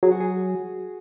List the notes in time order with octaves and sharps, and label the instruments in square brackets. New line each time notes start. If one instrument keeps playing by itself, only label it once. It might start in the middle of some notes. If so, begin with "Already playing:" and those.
[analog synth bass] F#3 [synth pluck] G#4
[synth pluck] F#4
G#4